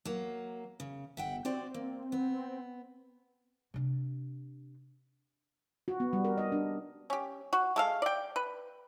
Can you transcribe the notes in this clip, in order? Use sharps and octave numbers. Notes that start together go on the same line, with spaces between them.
F#3 A#3
C#3
G1 E5 F#5 G5
C4 F#4 G4 D5
A#3
B3
C3 D4
F#4
B3
G3
A#4
D#5
D4
C#4 G4
F#4
G#3 A4 F5
D5 G5
B4